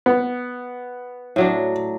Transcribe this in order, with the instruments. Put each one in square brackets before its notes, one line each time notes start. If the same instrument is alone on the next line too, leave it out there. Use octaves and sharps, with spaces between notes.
[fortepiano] B3
[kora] A2 F#3 D4